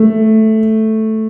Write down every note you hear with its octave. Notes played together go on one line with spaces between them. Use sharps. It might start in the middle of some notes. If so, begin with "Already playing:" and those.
Already playing: A3